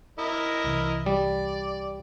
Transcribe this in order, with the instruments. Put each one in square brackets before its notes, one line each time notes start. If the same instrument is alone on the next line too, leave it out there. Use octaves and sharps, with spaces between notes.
[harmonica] E4 A#4 D#5
[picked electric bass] C2 C3 E3
[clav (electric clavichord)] G3 [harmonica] D5